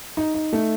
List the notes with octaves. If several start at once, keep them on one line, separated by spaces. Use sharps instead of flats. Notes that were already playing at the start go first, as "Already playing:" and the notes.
D#4
D#4
A3